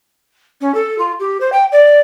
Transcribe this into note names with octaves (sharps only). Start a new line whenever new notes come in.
C#4
A4
F4
G4
C5
G5
D5